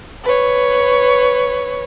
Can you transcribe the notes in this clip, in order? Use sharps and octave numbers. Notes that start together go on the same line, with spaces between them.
B4 C#5